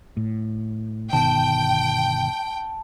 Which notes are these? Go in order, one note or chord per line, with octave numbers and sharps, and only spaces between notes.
A2
G1 B2 D#3 G5 A5